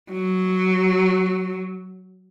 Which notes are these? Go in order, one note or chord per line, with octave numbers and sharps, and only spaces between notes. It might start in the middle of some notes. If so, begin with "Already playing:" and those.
F#3